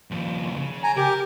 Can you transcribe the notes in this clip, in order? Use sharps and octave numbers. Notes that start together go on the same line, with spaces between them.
D#2 F3
C#3
G#5 A#5
G4 A#4